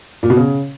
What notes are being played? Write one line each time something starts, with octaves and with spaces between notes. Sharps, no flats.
A#2
B2
C#3